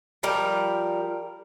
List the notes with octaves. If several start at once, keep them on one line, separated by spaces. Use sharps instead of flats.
F3 G3 A#4